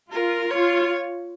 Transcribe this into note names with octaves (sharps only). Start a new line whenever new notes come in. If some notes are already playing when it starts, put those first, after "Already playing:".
F4 A#4
F4 C#5